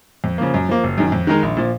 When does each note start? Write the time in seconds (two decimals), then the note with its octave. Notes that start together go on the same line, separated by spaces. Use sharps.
0.24 F2
0.38 C#3 F3 A#3
0.54 F#2
0.69 F3 A#3
0.84 F#1
0.98 F#2 D#3
1.12 F2
1.27 D#3 G#3 D#4 A#4
1.43 A#1
1.57 A#2 F3